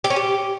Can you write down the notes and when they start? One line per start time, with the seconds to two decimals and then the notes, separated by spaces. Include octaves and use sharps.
0.04 G4
0.10 C#4
0.16 G4